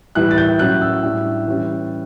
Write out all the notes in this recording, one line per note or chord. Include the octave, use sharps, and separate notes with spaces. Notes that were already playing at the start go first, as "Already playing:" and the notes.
A2 E3 G3 F#6
A6
G6
A2 F#3 C#4 F#6
E6
A2 G3 D4
E3 G3 C#4